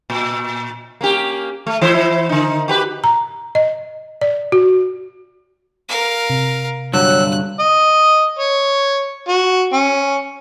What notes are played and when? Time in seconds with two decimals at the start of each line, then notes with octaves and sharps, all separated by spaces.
0.10 A#2
1.01 A#3 C#4 G4
1.67 A3
1.81 E3 E4 C5
2.29 D3 D#4
2.68 F#4 G4 B4
3.04 A#5
3.55 D#5
4.21 D5
4.52 F#4
5.89 A#4 F5
6.30 C3
6.94 G2 D3 F#3 E6 F#6
7.60 D#5
8.39 C#5
9.28 F#4
9.73 C#4